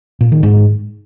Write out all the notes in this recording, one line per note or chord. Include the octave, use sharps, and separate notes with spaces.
A#2
D#3
G#2